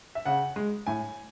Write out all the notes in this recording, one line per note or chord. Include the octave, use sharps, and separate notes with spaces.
E5
C#3 F#5
G#3
A2 G#5